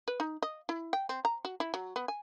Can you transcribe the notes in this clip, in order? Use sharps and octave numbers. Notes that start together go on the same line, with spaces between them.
B4
D#4
D#5
E4
G5
C4
A#5
F#4
E4
F#3
B3
G#5